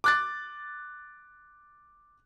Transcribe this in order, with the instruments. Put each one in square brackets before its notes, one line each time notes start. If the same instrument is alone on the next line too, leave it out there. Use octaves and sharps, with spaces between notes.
[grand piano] D6 F#6 A6